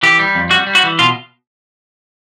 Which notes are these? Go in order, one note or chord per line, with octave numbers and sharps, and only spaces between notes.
E3 G4
G3
F2
G3 F#4
G3
F#4
E3
B2 F4